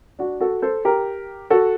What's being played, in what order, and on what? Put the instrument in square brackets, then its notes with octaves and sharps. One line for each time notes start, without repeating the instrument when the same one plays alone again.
[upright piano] D4 F#4
F#4 A4
A4 C5
G4 A#4
F#4 A4